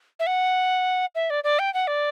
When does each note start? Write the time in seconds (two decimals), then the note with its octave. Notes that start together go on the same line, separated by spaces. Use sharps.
0.20 E5
0.27 F#5
1.15 E5
1.30 D5
1.44 D5
1.59 G5
1.74 F#5
1.87 D5